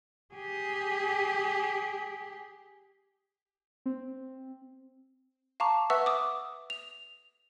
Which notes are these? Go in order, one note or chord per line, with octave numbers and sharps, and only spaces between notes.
G4 G#4
C4
F5 A5 A#5 C#6 D6
B4 E5 F#5 C#6 E6
D6 D#6
F7